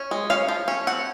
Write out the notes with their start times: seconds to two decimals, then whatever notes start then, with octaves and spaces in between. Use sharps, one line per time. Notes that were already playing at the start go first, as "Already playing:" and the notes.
Already playing: C#4
0.11 G#3
0.30 C#4 F5
0.49 F3
0.68 C#4
0.87 C4 F#5